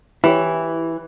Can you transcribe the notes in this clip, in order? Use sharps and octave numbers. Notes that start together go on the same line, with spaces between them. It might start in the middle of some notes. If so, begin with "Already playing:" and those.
E3 E4 G4 C#5